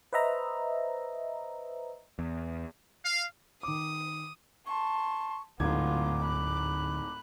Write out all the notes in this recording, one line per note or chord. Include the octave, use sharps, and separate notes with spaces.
B4 C5 D#5 E5 A#5
E2
F5
D#3 D6 D#6
A5 C6 C#6
D1 D2 G#2 B3 F4 D6 G#6
B5 F#6